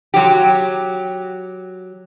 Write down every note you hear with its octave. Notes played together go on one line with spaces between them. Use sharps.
F#3 G4